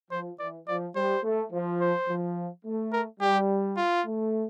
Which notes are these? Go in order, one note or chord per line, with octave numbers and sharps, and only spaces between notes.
F3 C5
E3 D5
F3 D5
G3 C5
A3
F3
C5
F3
A3
A#4
G3 G4
F4
A3